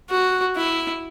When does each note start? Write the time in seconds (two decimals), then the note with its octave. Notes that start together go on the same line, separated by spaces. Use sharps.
0.10 F#4
0.57 E4